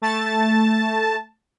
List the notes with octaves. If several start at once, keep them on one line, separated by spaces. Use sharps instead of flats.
A3 A5 A6